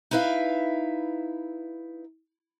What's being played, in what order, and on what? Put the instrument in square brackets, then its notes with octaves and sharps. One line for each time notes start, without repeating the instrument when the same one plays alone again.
[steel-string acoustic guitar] D#4 E4 B4 E5 F5